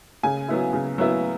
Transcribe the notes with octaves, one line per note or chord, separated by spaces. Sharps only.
C#3 G#5
F#3 B3 E4
C#3
F#3 B3 E4